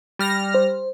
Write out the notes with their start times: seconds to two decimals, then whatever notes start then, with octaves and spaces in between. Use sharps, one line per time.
0.19 G3 F6 A#6
0.54 C5